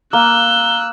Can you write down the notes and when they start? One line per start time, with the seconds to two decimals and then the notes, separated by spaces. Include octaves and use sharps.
0.13 A#3 E6 F#6 G7